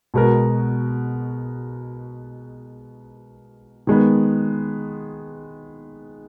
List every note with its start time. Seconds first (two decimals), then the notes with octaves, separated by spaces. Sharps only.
0.14 B2 G#3 B3 F#4 A#4
3.87 D#3 G#3 B3